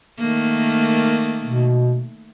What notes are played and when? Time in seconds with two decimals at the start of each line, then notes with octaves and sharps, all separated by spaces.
0.19 D#3 A3 A#3
1.44 B2